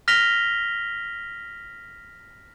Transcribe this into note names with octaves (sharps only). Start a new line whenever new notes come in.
F6 A#6 B6 F7 G7